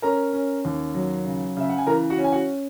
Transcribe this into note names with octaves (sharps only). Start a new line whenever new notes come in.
C#4 A#4 A#5
C#4
D#2
F#3
C#3
C#3 E5
F#5
G#5
E3 A#4 A#5
F#4 F#5
C#4
G#5
F#4 F#5